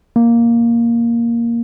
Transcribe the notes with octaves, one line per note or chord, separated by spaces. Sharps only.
A#3